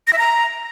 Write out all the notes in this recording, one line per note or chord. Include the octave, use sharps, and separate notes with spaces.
A#6
E5
A#5